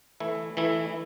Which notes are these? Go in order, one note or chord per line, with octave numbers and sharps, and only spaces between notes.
E3 A3 E4
E3 A3 E4